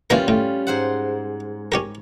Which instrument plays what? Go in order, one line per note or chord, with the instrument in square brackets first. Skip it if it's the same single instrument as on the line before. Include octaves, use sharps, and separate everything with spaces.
[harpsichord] A#2 E3 A#4 [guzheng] G3 C#4 F4
[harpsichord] A2
[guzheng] G#2 C5 F#5
[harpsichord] C#4 G4 A#4